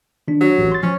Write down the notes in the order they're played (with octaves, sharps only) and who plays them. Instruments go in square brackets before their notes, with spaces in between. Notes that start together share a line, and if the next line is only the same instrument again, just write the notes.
[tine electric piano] D#3 D4
[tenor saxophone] F#3
[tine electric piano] A1 C#4
C6 A6
[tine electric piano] F3 [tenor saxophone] C#4